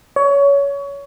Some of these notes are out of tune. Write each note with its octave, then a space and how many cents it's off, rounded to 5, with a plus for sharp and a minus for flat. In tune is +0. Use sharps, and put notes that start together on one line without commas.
C#5 +25